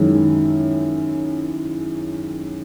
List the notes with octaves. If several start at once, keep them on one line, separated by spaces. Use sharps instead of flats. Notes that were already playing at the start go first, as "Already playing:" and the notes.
Already playing: F#2 D#3 G#3 C#4 E4